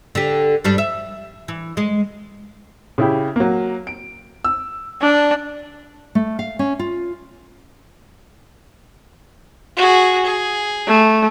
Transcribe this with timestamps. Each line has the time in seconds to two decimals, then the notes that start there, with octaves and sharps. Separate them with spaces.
0.15 D3 G4
0.64 G2 G3 D4
0.78 E5
1.48 E3
1.77 G#3
2.98 C#3 E4 G4
3.36 F#3 A#3
3.87 D7
4.44 E6
5.02 D4
6.15 A3
6.39 F5
6.59 C#4
6.79 F4
9.76 F#4 G#4
10.25 G#4
10.87 A3